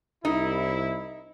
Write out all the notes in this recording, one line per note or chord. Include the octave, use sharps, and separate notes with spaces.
C2 D#4 E4